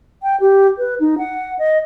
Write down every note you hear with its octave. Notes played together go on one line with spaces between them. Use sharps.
G5
G4
B4
D#4
F#5
D#5